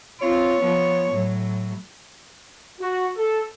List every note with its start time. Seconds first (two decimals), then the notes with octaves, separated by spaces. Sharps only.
0.21 C4 F4 C#5
0.60 F3 B3
1.11 A2 F#3
2.80 F#4
3.17 A4